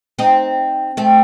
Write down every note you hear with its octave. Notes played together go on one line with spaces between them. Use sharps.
C4 D#4
A3 C4